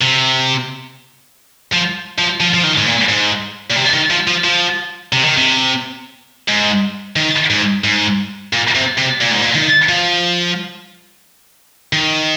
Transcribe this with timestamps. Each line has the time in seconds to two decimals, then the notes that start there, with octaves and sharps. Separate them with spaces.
0.02 C3
1.73 F3
2.18 F3
2.40 F3
2.54 F3
2.64 D#3
2.78 G#2
2.86 A#2
3.09 G#2
3.70 A#2
3.76 C3
3.93 D#3
4.10 F3
4.27 F3
4.44 F3
5.13 C3
5.24 D#3
5.37 C3
6.48 G#2
7.16 D#3
7.50 G#2
7.84 G#2
8.53 A#2
8.75 C3
8.97 C3
9.21 A#2
9.31 G#2
9.42 A#2
9.55 D#3
9.89 F3
11.93 D#3